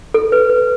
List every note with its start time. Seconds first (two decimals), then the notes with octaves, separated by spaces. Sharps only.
0.14 A4
0.32 B4
0.50 B4